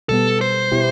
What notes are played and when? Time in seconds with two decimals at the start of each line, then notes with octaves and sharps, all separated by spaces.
0.09 B2 G3 B3 A4
0.41 C5
0.72 B2 B3 E4 G4